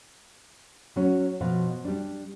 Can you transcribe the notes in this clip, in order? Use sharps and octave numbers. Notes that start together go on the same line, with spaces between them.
F#3 C#4
B2 F3 F5
G3 D4